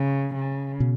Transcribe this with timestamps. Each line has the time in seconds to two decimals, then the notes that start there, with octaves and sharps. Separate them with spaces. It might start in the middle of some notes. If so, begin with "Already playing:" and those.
Already playing: C#3
0.35 C#3
0.80 B2